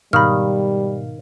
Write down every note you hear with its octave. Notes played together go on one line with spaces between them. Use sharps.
G#2 B2 D#3 G3 F5 B5 F6